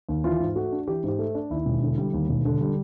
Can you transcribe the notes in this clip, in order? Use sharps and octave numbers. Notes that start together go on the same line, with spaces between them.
D#2
E3 F4
G#2
A3 F#4
D4
E3 G4
G#2 G4
A3
D4
D#2 E4
E1
D3
G3
D#2
E1
D3
G3